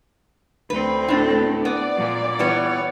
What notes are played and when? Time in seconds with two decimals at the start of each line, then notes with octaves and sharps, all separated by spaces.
0.70 D2 C4 B4
1.08 A2 D4 A4
1.65 B3 D5
1.98 A#2
2.39 E3 G3 B3 C#5